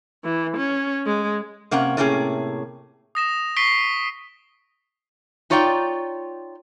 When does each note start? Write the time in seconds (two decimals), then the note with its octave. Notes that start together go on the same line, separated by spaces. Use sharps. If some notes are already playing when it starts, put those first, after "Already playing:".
0.24 E3
0.57 C#4
1.06 G#3
1.71 C3 A#3 C#4 F#5 A#5
1.97 A2 C3 A#3 C#4 G#4
3.15 D#6 A#6 E7
3.56 C#6 B6 C7 D7 G7
5.50 D#4 F4 C#5 D5 F5 G5